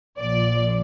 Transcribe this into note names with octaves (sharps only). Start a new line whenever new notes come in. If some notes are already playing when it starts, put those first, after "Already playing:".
A#1 A#2 F3 D5